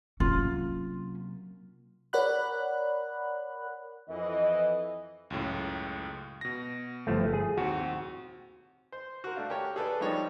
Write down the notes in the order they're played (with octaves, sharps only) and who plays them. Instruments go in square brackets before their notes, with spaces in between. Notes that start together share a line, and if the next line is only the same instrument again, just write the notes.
[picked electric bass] C3 F#3 A#3 [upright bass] C#4 [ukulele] F4
[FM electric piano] A#4 C#5 D5 F#5 B5 F#6
[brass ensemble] F2 E3 D#5
[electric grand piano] C#2 F#2 A2
B2 A#6
[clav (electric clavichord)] G1 F3 A3
G#4
[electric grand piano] D#2 C4 [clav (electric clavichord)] F#4
[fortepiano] C5
F#4 A#4
A3 D4 F5
G4 A#4 C#5
G#4 A4 B4 D5
F3 G3 D4 D#4 C#5 D#5